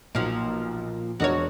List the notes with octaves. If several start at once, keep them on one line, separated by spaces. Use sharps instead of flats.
B1 A#2 F3
E1 D4 F#4 A#4 C#5 D#5